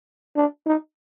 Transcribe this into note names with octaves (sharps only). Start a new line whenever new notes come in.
D4
D#4